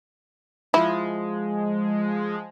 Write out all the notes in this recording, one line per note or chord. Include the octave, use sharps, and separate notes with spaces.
F3 G#3 E4